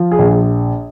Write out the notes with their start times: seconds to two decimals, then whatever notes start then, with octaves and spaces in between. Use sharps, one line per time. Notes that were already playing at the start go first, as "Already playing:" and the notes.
Already playing: F3
0.12 G#4
0.19 A#1